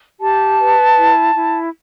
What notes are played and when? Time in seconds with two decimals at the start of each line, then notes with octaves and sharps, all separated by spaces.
0.21 G4 A5
0.59 B4
0.97 E4
1.35 E4